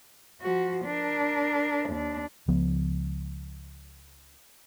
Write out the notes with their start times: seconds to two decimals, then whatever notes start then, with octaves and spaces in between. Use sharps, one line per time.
0.41 F3 F#4
0.85 D4 A#4
1.90 D#2 D4
2.48 C#2 F3 B3